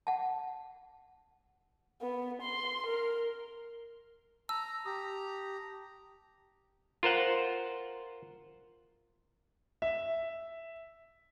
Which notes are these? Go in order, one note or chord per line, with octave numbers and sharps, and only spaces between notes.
F#5 A5
B3
C6
A#4
A5 A#5 E6
G4 A#5 D#6
F4 A#4 C5 F#5
E5